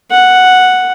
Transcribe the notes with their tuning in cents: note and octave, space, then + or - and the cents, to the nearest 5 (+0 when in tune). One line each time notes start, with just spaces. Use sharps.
F#5 +0